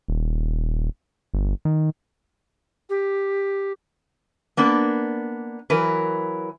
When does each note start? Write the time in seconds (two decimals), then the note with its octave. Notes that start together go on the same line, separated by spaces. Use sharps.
0.08 D#1
1.34 G1
1.65 D#3
2.89 G4
4.57 A#3 B3 D4
5.70 E3 F#3 A#4 B4